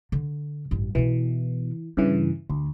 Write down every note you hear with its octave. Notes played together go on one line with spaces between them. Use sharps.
D3
A1 G2
B2 E3 B3
G2 C#3 E3 E4
D2 A3